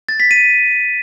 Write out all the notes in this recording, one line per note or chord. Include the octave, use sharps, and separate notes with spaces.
A6
B6
D#7